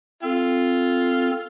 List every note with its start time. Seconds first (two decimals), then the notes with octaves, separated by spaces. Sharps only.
0.23 C4 F4 A4